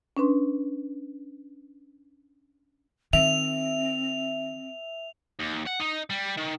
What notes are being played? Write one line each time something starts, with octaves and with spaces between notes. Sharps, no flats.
C#4 D4 B4 C6
D#3 C4 E5 F7
D#2
F#5
D#4
G3
D#3